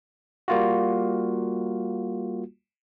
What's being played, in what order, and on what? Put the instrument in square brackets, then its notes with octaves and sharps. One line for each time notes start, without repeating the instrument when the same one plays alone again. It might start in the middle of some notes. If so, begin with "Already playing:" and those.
[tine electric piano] G3 A#3 F4 F#4